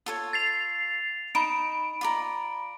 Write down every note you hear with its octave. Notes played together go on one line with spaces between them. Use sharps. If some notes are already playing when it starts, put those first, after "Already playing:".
F4 A4 C#5
A6 C7 F7
D#4 B5 D7
F4 D5 A#5